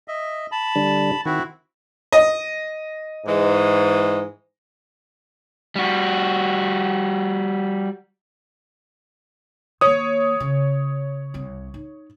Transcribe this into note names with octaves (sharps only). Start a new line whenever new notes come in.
D#5 E5
A5 B5
D3 G3 D4
D#3 C4 E4 F#4
D#5
G#2 E3 G#3
G3 F#4
D#3 A#3 C#5 D#6
C#3
C2 C4
D#4